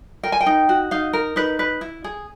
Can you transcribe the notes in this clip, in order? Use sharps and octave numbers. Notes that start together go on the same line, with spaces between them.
A#4 G5
G#5
G5
D#4
F#4
D#4 F5
A#4
D#4 B4
B4
E4
G#4